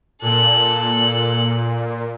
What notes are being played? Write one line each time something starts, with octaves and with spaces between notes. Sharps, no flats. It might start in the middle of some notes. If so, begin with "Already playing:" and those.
A#2 A4 F#6